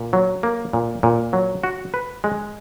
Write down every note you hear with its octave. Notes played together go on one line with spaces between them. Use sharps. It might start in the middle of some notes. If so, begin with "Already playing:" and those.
Already playing: A#2
F#3
A#3
A#2
A#2
F#3
F#4
B4
G#3